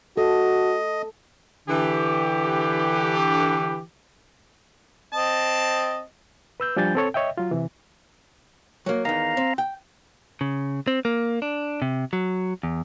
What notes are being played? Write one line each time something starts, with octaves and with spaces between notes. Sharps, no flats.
F#4 A4 D#5
D3 E3 G4
C4 D#5 A5
B4 E6 G6
F3 G3 D4 G#5 G6 A6
C4 A4 C#5
C#5 D#5 E5 G5
F#3 F4
C3 E3
F#3 A#3
E2 D#3 F5 A#5
C4
G5
C#3
C4
A#3
D4
C3
F#3
E2